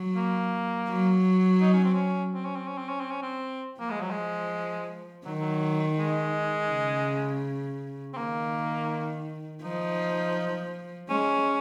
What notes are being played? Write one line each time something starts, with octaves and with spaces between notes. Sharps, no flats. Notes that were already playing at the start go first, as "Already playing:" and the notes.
Already playing: F#3
A#3
F#3
D#4
C#4
C4
C#4
C4
C#4
C4
C#4
C4
C#4
C4
C#4
C4
F3 A#3
G#3
F#3
G#3
D#3 F#3
F#3
G#3
C#3
C4
D#3 A#3
F3 D#4
G#3 C#4